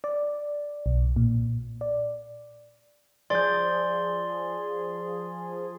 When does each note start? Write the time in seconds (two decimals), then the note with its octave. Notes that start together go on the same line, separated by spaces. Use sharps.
0.04 D5
0.86 B1
1.16 A#2
1.81 D5
3.30 F3 G#4 D5 C6 G6 A6 G7